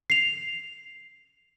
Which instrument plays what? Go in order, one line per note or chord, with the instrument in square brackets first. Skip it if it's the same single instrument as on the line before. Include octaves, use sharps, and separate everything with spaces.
[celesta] C7 F7